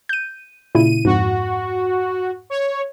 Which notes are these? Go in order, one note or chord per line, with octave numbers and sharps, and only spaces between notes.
G6 D#7
A#2 C#3 E4 D#7
F2 G#2 F#4
C#5